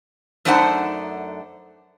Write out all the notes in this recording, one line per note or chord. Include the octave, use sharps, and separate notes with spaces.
F#2 A3 D4 D#4 C5 F#5